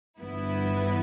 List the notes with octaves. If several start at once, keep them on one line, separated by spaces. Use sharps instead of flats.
G1 G2 E3 B3 E4